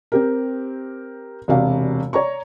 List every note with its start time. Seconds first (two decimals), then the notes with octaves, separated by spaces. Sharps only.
0.12 C4 G4 A#4
1.48 E1 C3 F#4 D5 F5
2.13 C#5 D5 A#5 C#6